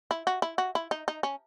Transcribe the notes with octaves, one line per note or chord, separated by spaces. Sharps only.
E4
F#4
E4
F#4
E4
D#4
D#4
C#4